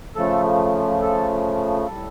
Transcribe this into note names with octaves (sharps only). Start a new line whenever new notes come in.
C#3 F3 A3 A4
A4
A2 G3 A4